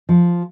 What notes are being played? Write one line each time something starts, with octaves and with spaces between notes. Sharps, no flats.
F3